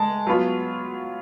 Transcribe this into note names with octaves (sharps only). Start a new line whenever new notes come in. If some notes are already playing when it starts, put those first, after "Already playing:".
Already playing: G#3 A5
F#3 B3 F4